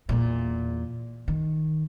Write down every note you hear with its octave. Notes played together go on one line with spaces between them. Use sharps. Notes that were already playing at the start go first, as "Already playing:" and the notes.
E2 A#2
D#3